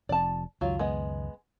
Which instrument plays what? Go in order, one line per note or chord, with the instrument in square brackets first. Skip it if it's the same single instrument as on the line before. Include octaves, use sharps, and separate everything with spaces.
[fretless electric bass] F1 F2 [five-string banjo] D5 A5
[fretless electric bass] C#2 F#2 D#3 [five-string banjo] F#3 F4
[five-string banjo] G#3 B3 D#5